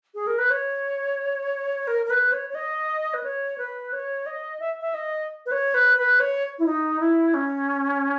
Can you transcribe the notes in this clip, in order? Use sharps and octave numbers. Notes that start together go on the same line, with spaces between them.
G#4
A#4
B4
C#5
A#4
A#4
B4
C#5
C#5
D#5
B4
C#5
B4
C#5
D#5
E5
E5
D#5
B4
C#5
B4
B4
C#5
E4
D#4
E4
C#4